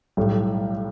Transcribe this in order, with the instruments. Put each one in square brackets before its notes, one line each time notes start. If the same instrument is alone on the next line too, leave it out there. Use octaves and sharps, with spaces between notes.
[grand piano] B1 A2 G3